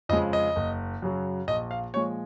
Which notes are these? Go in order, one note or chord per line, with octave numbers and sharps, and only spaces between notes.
F2 C#3 F3 G#3 D#5
D#5
F#1
F#2 C#3 F#3
A#1 D#5
F5
A#2 F3 G#3 C#5